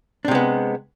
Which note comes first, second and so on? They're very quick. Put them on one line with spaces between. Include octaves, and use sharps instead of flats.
D4 C3 G#3 B3